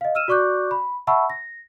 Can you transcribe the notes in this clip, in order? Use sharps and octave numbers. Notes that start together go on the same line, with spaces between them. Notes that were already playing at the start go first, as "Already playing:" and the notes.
D#5 F5
E6 F6 D#7 E7
F#4 D5 C#6 D6 F#6 G6
B5
E5 F#5 A5 B5 C#6 E6
A#6